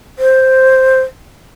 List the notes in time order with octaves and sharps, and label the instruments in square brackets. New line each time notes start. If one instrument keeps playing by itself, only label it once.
[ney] C5